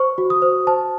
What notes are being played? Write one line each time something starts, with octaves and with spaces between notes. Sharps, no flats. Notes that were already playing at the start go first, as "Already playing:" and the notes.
Already playing: C5 C#6
F#4
D#6
C5
C5 A5